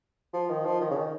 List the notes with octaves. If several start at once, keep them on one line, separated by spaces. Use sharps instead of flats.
F3
D#3
F3
D#3
C#3
D#3